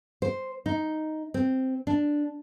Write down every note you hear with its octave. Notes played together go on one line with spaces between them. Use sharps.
C5
D#4
C4
D4